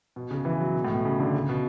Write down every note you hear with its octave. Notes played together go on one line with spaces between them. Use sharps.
B2
C#3
E3
F#3
B2
A2
B2
C#3
D3
C#3
B2